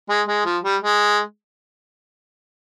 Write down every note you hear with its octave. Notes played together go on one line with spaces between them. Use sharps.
G#3
G#3
F3
G3
G#3